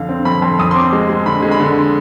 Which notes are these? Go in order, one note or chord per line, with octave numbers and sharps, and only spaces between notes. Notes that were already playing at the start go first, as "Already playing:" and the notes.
Already playing: F2 D3 F5
C4
F2 B5
F2 C6
F2 D#6
C6
C4 D6
G#3
G#3
D3 B5
G#3
B5
D3